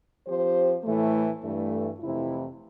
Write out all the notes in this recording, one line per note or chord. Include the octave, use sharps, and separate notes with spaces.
F3 C4 G4 C5
A2 E3 A3
G2 E3 A3
F2 C3 E3 A3 E4